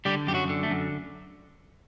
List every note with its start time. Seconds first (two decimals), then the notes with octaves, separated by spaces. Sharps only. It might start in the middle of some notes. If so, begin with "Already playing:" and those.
0.05 D3 G3 G4
0.27 F#2 G4
0.34 F#3 F#4
0.49 D3
0.63 A3
0.70 F#2